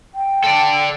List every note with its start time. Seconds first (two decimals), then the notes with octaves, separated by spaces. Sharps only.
0.15 G5
0.44 A4 D5